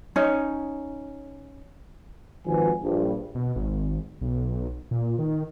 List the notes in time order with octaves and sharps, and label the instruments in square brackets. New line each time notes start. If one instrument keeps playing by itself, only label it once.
[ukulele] C#4 D#4
[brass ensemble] G#1 D#3 F3 F#4 B4 G#5
A#1 G2
[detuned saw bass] B2
G#1
B1
A#2
D#3